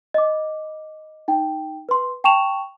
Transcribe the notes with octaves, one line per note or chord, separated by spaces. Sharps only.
D#5 D6
D#4 G5
B4 C6
G5 A5 C#6 E7 F7